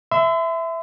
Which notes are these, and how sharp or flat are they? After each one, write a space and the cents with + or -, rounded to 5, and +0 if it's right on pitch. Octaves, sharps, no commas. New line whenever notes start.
E5 +0 C6 -45